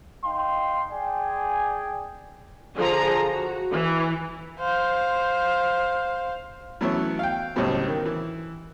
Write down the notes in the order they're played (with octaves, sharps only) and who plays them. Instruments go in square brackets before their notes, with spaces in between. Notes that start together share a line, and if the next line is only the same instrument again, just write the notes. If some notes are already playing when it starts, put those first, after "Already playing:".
[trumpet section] D#4 F5 G5 C6
G#4 D5 G5 G#5
[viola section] D3 F3 G#4 A#5
F#4
E3
[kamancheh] C5 F5
[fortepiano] E3 F#3 A3 B3 C#4 E4
F5 G5
C#2 A2 F#3 G3 B3 C4
D#3
E3